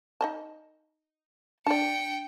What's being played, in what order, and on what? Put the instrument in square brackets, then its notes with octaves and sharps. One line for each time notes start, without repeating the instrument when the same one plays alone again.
[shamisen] D#4 D#5 A5
[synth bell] D4 [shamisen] D5 A5 [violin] G5 C#7